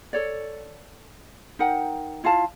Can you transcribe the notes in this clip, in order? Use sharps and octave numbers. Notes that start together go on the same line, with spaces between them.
A4 C#5 D5
D#4 A#4 F#5 G5
E4 F4 F5 A5